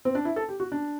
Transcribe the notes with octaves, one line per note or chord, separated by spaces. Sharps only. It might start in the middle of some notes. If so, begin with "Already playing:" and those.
C4
D4
E4
A4
G4
F#4
D4